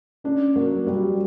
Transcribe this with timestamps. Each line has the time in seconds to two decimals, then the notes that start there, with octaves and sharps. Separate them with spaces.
0.24 C#4 D4
0.56 F#3 A#3
0.87 F#3 G3